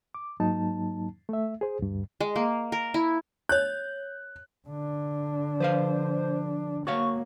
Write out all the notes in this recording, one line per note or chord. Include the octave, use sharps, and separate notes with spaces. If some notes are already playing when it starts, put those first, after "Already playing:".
D6
G#2 F#3 A#3 D#4 A5
A3 E5
G#4 C5
D2 G2
G#3
A#3
A#4
E4
C#5 F#6 G6
D3 D4
F3 B4 C5 F5
A#3 F#4 C#5 F5 C#6